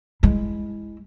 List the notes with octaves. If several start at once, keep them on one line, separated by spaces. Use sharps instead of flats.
G#3 E4